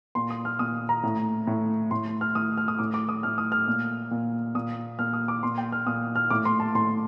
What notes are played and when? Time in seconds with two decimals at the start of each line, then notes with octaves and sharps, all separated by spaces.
0.15 A#2 C6
0.30 D#6
0.45 F6
0.59 A#2 D#6
0.89 A#5
1.03 A2
1.47 A2
1.91 A2 C6
2.21 F6
2.35 A2 D#6
2.57 F6
2.68 D#6
2.79 A2 D6
2.94 D6
3.09 D#6
3.23 A2 F6
3.38 D#6
3.52 F6
3.67 A#2
4.11 A#2
4.55 A#2 D#6
4.99 A#2 F6
5.13 D#6
5.28 D6
5.43 A#2 C6
5.58 G5
5.72 F6
5.86 A#2 D#6
6.16 F6
6.30 A2 D6
6.45 C6
6.60 A5
6.75 A2 C6